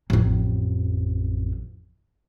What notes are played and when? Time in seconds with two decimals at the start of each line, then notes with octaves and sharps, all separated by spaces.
0.10 A1 F2